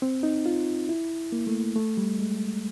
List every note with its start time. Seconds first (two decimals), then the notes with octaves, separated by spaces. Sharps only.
0.02 C4
0.23 D#4
0.46 F4
0.89 E4
1.32 A#3
1.47 A3
1.76 A3
1.97 G3
2.19 G#3